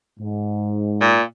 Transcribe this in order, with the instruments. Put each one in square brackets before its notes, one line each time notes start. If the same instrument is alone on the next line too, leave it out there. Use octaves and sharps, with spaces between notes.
[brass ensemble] G#2
[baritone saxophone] A#2